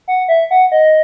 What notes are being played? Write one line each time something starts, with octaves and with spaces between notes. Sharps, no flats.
F#5
E5
F#5
D#5